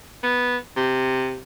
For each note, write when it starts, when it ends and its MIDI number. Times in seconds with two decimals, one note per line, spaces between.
0.23 0.56 59
0.77 1.40 48